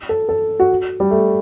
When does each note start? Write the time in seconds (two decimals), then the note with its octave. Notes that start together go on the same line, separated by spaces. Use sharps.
0.09 A4
0.29 A4
0.60 F#4
1.00 G3
1.11 A3